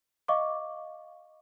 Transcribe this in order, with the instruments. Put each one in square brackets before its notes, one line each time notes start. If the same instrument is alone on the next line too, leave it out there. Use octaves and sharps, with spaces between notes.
[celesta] D#5 F5 C#6 D6